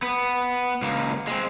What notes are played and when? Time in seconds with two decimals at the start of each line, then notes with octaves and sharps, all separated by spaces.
0.02 B3
0.82 C#2 A#3
1.27 G#3 C4